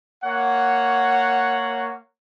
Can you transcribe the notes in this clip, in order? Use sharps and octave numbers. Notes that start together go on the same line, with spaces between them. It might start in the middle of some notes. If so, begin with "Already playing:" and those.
A#3 C#5 F#5